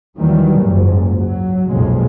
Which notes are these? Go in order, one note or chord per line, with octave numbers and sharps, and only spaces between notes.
D#2 D#3 E3 F#3 G3
F#1 C#2 G#2
F#3
B1 F2 A#2 C#3 G#3